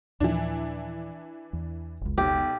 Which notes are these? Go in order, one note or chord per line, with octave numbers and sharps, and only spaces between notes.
D#2 A#2 E3 F3 D4
E2
F#1 C#2
B1 G4